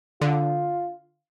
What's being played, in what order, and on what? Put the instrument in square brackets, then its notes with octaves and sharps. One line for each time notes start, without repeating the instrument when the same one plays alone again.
[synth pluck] D3 [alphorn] F4